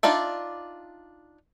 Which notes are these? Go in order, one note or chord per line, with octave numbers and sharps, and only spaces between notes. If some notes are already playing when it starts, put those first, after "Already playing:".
D4 D#4 F4 D5 E5